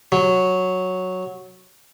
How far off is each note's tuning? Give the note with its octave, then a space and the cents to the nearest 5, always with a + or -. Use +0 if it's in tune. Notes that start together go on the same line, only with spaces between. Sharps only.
F#3 -5